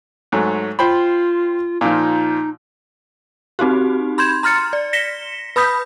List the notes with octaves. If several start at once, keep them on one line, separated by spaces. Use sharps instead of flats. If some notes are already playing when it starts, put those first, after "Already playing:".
G#2 F#3 A3
F4 C5 G5 B5
A#2 F3 D#4
C4 D#4 F#4 G4
B5 C6 G6 G#6 E7
A#5 C6 F6 A6 C#7
D5
A#6 B6 C#7 E7 G7
B4 B5 D#6 G6 B6